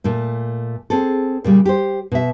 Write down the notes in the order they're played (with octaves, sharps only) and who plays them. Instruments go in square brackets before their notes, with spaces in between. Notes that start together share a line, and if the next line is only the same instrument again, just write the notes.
[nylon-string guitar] A#2 A3
C4 G#4 A4
A#2 C#3 G3
G4 C5
B2 E5